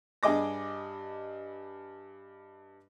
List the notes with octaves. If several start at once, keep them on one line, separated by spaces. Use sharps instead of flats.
G2 G3 G#4 D#5 D6 A#6